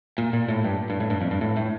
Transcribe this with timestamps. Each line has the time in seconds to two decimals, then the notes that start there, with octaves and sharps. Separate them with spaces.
0.18 A#2
0.33 A#2
0.49 A2
0.64 G2
0.90 G2
1.00 A2
1.10 G2
1.21 F2
1.31 G2
1.41 A2
1.57 A2